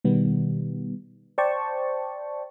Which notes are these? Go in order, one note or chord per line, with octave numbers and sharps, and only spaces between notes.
B2 D#3 G3 B3
C5 D5 G5 A5 C#6